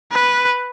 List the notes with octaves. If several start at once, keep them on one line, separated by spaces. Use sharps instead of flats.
B4